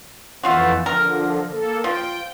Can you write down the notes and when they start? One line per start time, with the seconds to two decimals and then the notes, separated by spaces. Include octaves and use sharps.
0.43 F2 E3 A3 B3 F4 F#4
0.86 D3 F3 A#4
1.50 A#3 A4
1.84 F3 G5